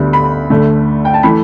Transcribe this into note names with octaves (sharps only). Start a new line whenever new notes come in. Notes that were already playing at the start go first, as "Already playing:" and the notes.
Already playing: D2 D3 G3 B3
B5
D2 D3 A3
G5
A5
E3 A3 B5